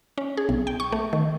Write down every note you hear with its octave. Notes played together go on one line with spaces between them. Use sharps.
C#4
G#4
B1
G5
C#6
A3
D#3